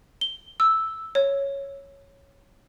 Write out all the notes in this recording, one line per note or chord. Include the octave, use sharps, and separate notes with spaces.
G7
E6
C#5